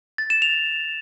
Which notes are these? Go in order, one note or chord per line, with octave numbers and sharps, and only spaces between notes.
A6
E7
F7